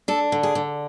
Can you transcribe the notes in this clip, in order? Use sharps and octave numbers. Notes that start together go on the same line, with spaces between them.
D4 A4
D3
G#4
D3